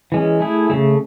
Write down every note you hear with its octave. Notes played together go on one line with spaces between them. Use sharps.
E3 G#3 C#4
A3 E4 G#4
C#3 F#3 A3